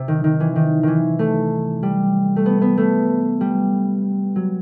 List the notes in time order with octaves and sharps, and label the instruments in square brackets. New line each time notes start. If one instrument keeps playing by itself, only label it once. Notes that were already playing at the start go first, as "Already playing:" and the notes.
Already playing: [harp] C3
D#3
D#3
E3
D#3
D#3 E3
A3
G3
A3
B3
B3
A3
G3
F#3